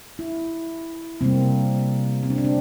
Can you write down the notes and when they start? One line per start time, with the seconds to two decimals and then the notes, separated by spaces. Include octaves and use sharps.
0.19 E4
1.21 C3 G3 A#3 C4
2.23 C4
2.30 D4
2.38 C4
2.45 D4